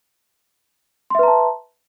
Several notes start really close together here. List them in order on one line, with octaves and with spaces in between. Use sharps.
C6 E5 B4 A#5 A5